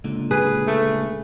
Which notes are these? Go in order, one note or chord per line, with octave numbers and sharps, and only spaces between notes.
C#2 A#2 D3
G#4 B4
A3